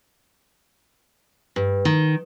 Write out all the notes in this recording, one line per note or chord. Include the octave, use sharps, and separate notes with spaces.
G2
D#3